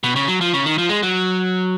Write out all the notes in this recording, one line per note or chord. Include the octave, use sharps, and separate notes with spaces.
B2
C#3
F#3
F3
C#3
D#3
F3
G#3
F#3